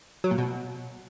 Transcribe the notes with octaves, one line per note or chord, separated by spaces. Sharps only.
F#3
A#2
B2